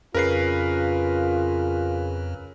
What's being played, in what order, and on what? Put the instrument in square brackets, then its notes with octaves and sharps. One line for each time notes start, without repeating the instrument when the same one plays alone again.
[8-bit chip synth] F2 [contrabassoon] C#3 [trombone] F4 [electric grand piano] A#4 B4 C7